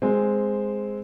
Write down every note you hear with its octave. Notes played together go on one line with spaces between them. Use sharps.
G#3 C4